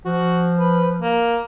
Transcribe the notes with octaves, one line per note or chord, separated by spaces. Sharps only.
F3 F#4
B4
A#3